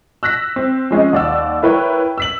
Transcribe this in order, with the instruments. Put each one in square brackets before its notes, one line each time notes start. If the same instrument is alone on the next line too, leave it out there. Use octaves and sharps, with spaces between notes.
[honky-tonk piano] E6 F#6 A#6 B6
C4
F3 G#3 C#4 D#5
D#2 D5 F#5 E6
E4 A#4 B4 C#5 G5
E6 B6 F#7